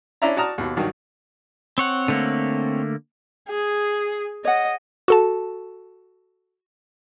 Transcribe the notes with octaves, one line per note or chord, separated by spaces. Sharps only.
C#4 D4 E4 D5 E5 A#5
F#4 D5 A5 A#5 D#6 F6
D#2 B2
G2 D#3 F#3 F#4
C4 C#5 F#5
D3 A3 A#3
G#4
C#5 D#5 F#5
F#4 A4 A5